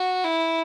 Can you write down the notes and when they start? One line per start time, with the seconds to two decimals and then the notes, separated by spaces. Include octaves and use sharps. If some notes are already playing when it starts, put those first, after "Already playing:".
Already playing: F#4
0.24 E4